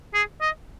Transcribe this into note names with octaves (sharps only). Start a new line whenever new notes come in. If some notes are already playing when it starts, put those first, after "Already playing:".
G#4
D#5